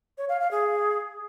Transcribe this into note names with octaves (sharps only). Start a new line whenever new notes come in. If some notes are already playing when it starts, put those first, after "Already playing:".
C#5
F5
F5
G#4